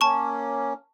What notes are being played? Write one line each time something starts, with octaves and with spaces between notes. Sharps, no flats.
A#3 C#4 A5 C#6